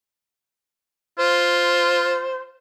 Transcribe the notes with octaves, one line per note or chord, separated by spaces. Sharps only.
F4 C5